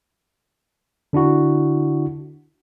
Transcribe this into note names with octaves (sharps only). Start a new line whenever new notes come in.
D3 D4 E4 F#4